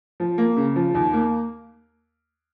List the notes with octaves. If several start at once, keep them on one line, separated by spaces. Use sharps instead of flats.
F3
A#3
C#3
F3
D#2
A#3